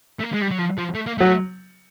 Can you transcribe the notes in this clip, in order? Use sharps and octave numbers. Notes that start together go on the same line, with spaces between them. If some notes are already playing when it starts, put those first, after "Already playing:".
A3
A#3
G#3
G3
F#3
F3
F3
A3
A#3
F#3 A3